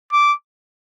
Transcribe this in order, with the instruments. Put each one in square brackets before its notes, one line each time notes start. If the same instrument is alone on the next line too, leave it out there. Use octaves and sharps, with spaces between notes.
[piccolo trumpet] D6